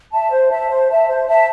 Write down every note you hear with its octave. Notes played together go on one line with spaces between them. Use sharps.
E5 A5
C5
E5 A5
C5
E5 A5
C5
E5 A5